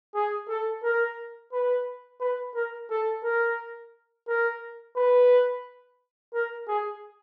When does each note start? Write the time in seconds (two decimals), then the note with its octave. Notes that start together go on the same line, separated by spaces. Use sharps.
0.15 G#4
0.48 A4
0.83 A#4
1.53 B4
2.21 B4
2.55 A#4
2.90 A4
3.24 A#4
4.28 A#4
4.97 B4
6.34 A#4
6.68 G#4